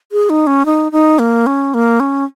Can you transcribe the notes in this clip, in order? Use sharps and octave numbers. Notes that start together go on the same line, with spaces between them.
G#4
D#4
C#4
D#4
D#4
A#3
C#4
A#3
C#4